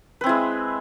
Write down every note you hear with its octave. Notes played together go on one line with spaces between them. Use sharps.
G#3 C4 E4 B4